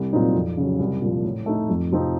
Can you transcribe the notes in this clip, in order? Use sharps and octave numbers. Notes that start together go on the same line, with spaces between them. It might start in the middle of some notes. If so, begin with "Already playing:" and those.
Already playing: C2
A#2 F#3 C4 D#4
F2
C#3 F#3
C2
A#2 F3
A2
A3 D#4
F2
C3 F3 C4 D#4